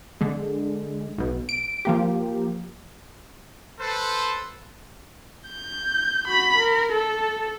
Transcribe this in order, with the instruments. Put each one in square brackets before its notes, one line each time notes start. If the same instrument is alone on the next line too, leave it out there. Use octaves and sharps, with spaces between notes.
[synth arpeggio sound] D3 G#3
B1 B2
D7
F3 A#3 G4
[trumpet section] A4 B4 C5
[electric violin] G6
F#4 B5
A#4
A4